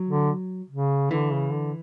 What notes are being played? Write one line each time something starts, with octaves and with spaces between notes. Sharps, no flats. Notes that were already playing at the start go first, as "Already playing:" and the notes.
Already playing: F#3
D3
C#3
D3 E3
C#3
D3